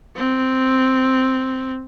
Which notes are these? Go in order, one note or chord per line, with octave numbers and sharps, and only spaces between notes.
C4